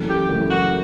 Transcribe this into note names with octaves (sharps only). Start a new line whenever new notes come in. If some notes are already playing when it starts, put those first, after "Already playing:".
Already playing: F#1 F#2 E3 A3
G4
F#1 F#2 E3 A3
F#4